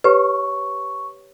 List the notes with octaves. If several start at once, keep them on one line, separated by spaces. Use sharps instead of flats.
G4 B4 C#5 C#6